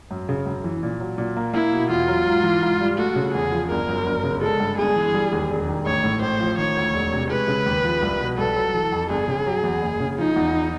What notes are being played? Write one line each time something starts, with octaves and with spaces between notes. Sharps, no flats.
F#2
C#3
F#2
E3
A#2
F#3
A#2
A#3
A#3 E4
B2
E2 F4
F#3
G#2
E3
G#2
G3
A3 F#4
C#3
E2 G#4
F3
G1 A#4
F#2
G1
C#3
G#3 A4
G2
G1 G#4
E3
G3
D#2
E1
D#3
A1 C#5
A2
A1 C5
F3
D#3 C#5
D2
E1
C3
G#3 B4
C#3
D#2
F3
C2
B2
C2 A4
F#3
E3
F2
G1 G#4
C#3
F#3
E2
F#1
C#3
F3 D#4
E2